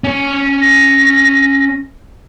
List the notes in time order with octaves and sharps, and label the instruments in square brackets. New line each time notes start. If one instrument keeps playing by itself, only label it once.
[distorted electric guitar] C#4 C#5
[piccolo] A#6